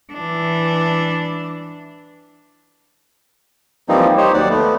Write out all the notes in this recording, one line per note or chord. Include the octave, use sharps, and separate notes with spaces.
E3 D4
E3 F3 G3 A#3 C4 D#4
D#4 G4 C5 C#5
D#2 F#3 D5 F#5
A3 B3